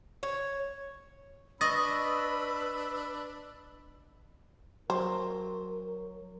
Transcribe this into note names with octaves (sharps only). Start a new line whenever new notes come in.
C#5
D4 B4 D#5 B5 C#6 D#6 E6 A6
F#3 A#4 C5